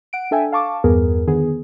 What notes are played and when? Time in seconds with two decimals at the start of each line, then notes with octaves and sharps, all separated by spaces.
0.13 F#5 D7
0.31 D4 A4 E5 G5 G#5
0.52 F5 A5 C#6 D6
0.84 E2 G2 B3 G#4 A#4
1.27 D3 D#3 B3 G#4